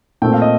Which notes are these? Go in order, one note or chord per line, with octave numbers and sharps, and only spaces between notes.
A#2 A3 C4 G5
F5
D#5